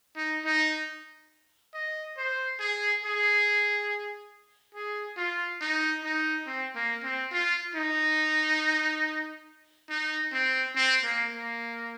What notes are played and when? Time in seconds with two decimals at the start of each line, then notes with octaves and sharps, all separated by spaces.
0.16 D#4
0.45 D#4
1.74 D#5
2.17 C5
2.60 G#4
3.03 G#4
4.74 G#4
5.17 F4
5.61 D#4
6.04 D#4
6.46 C4
6.75 A#3
7.03 C4
7.32 F4
7.75 D#4
9.89 D#4
10.33 C4
10.76 C4
11.04 A#3
11.33 A#3